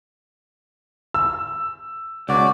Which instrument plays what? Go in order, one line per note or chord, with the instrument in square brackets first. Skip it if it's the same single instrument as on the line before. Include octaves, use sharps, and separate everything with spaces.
[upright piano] E6
[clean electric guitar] C#2 [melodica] F#4 D5